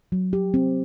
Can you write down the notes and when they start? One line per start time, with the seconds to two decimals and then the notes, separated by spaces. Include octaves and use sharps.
0.12 F#3
0.33 G4
0.54 C4